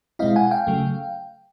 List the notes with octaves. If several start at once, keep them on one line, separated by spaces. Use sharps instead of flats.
B2 G#3 C4 E4 D#5 F5
F#5 G#5
F5 G5
C#3 F#3 A3